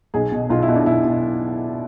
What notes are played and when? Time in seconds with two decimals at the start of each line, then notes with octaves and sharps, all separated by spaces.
0.14 B1 G#4
0.32 B2
0.50 B1 F4
0.62 E4
0.68 B2
0.75 D4
0.86 B1 E4
1.05 B2